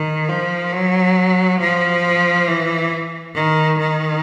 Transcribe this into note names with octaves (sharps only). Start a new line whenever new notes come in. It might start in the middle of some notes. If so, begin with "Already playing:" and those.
Already playing: D#3
F3
F#3
F3
E3
D#3
D#3